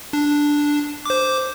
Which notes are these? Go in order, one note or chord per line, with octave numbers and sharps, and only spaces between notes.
D4
C5 D6